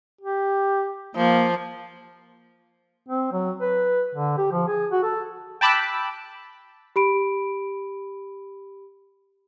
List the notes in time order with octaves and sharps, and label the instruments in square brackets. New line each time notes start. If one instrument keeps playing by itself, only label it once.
[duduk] G4
[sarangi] F3 [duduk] A#3
[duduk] C4
F#3
B4
D3
G4
F3
G#4
F#4
A4
[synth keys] G5 A5 B5 D6 E6 F#6
[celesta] G4 B5 D7